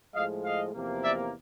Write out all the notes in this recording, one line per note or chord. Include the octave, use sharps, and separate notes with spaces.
A2 F3 G#3 D#5 F5
D#5 F5
E2 C3 F3 A#3
D5 E5